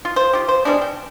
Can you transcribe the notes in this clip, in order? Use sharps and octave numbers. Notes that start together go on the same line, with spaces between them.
F4
C5
F4 G4
C5
G3 G#3 B3 D4
G5